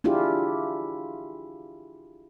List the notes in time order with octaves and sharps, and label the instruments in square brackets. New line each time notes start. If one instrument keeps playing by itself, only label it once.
[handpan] D4 E4 F4 G4 G#4